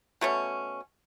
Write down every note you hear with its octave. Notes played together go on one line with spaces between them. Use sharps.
B2 A3 C#4